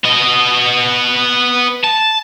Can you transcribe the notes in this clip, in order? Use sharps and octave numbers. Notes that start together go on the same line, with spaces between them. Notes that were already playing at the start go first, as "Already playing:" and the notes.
B3 D#5
A5